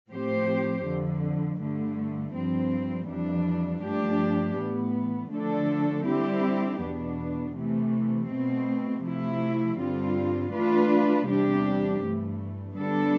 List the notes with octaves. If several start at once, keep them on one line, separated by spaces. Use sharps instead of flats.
A2 F3 C4 G4 C5
F2 D3 F3
G2 D3 A3
G2 F3 C4
F2 E3 G3 D4
G2 F3 A3 D4 G4
A2 E3 B3
D3 F3 A3 D4 A4
D3 G3 C4 E4 G4
E2 B2 B3 D4
C3 E3 A3
B2 A3 C4
C3 F3 A3 E4
G2 D3 G3 C4 F4
E3 A3 D4 F4 B4
E2 C3 G3 D4 G4
G2 E3 A3
D3 G3 B3 D4 A4